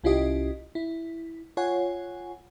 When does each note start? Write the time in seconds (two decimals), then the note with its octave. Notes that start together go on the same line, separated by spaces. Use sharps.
0.04 C2 C#4 E4 F4 G4 D#5
0.75 E4
1.57 F4 C#5 F#5 G#5